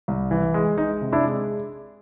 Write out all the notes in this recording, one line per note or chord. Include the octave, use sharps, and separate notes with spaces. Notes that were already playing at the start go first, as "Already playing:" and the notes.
C2
E3
G#3
G#3 D#4
C3
D4 E4
G#3